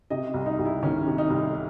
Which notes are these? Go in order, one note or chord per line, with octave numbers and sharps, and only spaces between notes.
C3 D#5
C2
D#4
C2
E4
D#3 C#4
C3
D#4
C2